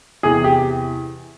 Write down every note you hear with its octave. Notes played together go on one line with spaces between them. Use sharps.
E2 C3 E3 G#4
G4